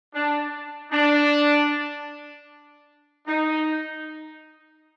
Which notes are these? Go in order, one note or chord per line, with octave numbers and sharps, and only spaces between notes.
D4
D4
D#4